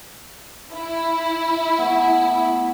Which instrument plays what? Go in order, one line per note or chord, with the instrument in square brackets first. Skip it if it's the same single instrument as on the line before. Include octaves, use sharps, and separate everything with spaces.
[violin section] E4
[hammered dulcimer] A3 B3